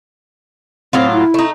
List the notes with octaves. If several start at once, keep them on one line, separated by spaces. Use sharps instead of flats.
A2 F#3 C4 F4
E4
A3 D#4